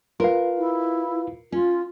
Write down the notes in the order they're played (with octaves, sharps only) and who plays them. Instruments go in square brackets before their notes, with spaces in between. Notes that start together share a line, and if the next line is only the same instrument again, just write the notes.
[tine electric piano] F4 B4 F5 [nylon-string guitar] A#4
[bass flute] E4
[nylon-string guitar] C#4 [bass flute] F4